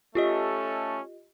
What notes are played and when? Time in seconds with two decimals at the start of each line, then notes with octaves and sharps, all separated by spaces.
0.15 A3 C#4 F4 G4 A4 D#5